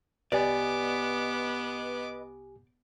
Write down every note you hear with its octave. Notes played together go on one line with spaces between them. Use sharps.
C2 B3 G4 B4 D5 D#5 G#5 D6